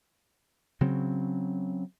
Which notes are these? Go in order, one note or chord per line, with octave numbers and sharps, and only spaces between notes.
C#3 F#3 C4